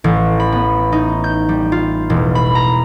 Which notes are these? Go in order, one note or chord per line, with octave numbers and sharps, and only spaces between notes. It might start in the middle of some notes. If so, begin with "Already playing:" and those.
A1
B5
B3
D#4
G6
G3
F4
E1
B5
A#5